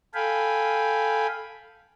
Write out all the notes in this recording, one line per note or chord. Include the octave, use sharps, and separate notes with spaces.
A4 F5 G5 G#5 B5